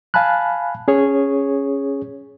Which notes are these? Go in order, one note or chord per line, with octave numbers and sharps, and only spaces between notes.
F5 G#5 A5 B5 F#6
C#4 G#4 C#5